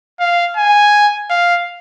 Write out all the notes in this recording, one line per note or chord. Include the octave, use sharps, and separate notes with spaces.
F5
G#5
F5